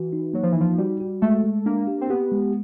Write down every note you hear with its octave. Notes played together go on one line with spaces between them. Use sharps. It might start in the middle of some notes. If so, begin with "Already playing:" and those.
Already playing: E3 F#4
D#4
F#3 A#3
F3
E3 D#4
F3
G3 F#4
F#4
G#3 A3
G#3
A#3 D4
G4
C4
B3 G4
G#3